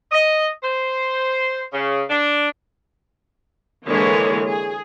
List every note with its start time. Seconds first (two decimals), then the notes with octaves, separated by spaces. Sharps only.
0.12 D#5
0.63 C5
1.73 C#3
2.10 D4
3.86 D3 E3 G#3 A#3 G#4 C#5
4.45 G#4